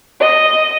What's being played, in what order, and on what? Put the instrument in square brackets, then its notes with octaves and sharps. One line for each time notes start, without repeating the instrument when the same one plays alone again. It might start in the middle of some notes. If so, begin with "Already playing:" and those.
[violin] D#5